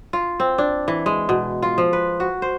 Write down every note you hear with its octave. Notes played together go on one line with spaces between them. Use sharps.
F4
C4
D4
E3
G#3
B2
F4
F3
B4
F#4
C5